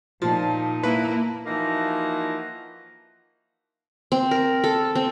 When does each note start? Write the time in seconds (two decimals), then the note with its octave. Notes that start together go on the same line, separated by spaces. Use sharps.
0.22 A#2 F3 D#4 A5
0.83 A#3 E4 B4
1.46 E3 F3 A#3 D#4 F#4 E5
4.12 C4
4.31 A#4
4.64 A4
4.95 C4